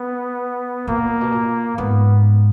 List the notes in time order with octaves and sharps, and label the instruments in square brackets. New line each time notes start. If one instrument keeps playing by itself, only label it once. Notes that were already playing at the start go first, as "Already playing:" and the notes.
Already playing: [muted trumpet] B3
[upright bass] A#2 [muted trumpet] A#3
[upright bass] B2
A#2
[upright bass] G#2 [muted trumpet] B3